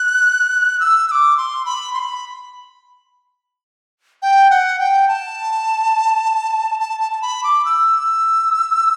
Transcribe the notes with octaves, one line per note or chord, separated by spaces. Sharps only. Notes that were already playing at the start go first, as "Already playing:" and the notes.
Already playing: F#6
E6
E6
D6
C6
B5
C6
B5
G5
F#5
G5
A5
A5
A5
A5
B5
D6
E6